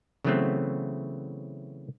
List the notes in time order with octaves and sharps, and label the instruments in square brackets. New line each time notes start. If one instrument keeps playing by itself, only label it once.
[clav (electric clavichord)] C#3 E3 F#3 A3 B3 C4